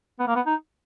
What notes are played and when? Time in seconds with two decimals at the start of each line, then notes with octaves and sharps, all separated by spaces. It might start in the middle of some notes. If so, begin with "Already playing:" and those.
0.20 B3
0.28 A#3
0.36 B3
0.47 D#4